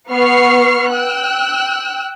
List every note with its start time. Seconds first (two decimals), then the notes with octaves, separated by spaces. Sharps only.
0.13 B3 C#6 F6 C7
0.91 G5 E6 F#6